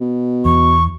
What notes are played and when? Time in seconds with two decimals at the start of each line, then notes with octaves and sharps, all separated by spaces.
0.01 B2
0.45 E2 C#6